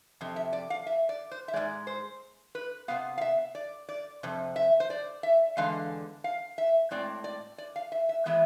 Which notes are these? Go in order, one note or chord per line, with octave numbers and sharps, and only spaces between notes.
F2 C3
E5
D5
F5
E5
D5
C5
E5
G#2 F3 G#3 D5
C5
B4
C3 F3 B3 F5
F5
E5
D5
D5
F2 C3
E5
C5
D5
E5
E2 D3 G#3 F5
F5
E5
A2 G#3 C4 D5
D5
D5
F5
E5
E5
A2 E3 G#3 B3 E5